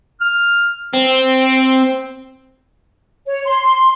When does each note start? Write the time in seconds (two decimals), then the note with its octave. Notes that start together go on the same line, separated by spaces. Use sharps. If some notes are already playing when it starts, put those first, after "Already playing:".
0.21 F6
0.94 C4
3.27 C#5
3.46 C6